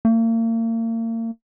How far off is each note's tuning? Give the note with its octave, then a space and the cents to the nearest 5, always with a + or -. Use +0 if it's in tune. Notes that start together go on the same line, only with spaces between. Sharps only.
A#3 -40